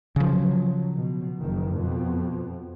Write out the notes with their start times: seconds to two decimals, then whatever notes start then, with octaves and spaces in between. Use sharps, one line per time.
0.16 C#3 F3 F#3
0.94 B2
1.39 F#1 D#3
1.75 F2 B2